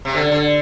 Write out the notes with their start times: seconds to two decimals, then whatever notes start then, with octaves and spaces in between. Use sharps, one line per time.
0.05 C3
0.15 D3
0.32 D3